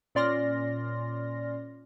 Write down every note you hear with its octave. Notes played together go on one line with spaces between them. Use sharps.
A#2 C#4 D5 C6 F6 A#6